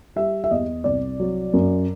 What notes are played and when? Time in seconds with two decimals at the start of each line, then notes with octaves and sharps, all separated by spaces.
0.16 G3 E5
0.44 E5
0.51 E2 D#5
0.84 C2 D5
1.20 F#3
1.54 F#2